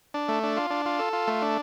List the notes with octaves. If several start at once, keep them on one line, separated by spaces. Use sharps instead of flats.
D4
A3
D4
F4
D4
F4
A4
F4
A3
D4